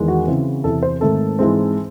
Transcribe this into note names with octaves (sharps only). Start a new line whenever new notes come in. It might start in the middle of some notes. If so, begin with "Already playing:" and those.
Already playing: E2 D#3 G#3
F#4
C#3 E3 C4
E2 C3 E3 A4
C5
G#2 D#3 A3 C4 A4
G#2 E3 G#3 C4